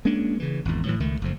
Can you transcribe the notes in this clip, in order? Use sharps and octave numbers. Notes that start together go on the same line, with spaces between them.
G#3 A#3 C#4 D4
C#3 E3
G#1 E2
A2 E3 F#3
C#2 D#3 A3
F#1 F2 F3